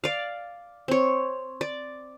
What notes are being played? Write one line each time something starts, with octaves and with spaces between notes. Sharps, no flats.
D5 F5
C4 C#5
D5